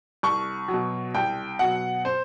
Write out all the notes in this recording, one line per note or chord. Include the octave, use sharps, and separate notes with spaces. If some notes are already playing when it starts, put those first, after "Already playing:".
C2 C#6
B2 F#3
C2 G5
B2 F#3 F#5
C5